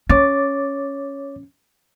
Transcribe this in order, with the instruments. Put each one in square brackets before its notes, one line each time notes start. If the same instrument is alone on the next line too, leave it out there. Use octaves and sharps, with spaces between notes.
[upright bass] C#4 [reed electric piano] C#5 D6 A6